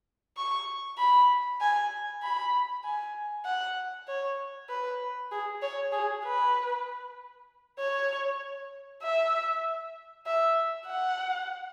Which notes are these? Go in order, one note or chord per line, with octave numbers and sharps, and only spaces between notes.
C#6
B5
G#5
B5
G#5
F#5
C#5
B4
G#4
C#5
G#4
B4
C#5
E5
E5
F#5